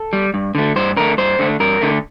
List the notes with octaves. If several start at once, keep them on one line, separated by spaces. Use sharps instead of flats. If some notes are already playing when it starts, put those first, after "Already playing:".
Already playing: A4
G3
G2
D3 A3
G2 C5
D3 A3 A#4
G2 C5
D3 A3
G2 A#4
D3 A3